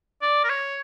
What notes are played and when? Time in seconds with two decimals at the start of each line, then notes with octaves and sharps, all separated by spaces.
0.22 D5
0.44 A#4
0.50 C#5